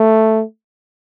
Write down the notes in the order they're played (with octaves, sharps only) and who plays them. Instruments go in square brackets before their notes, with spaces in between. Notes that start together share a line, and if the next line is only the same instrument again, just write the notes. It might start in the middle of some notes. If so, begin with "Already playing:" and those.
Already playing: [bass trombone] A3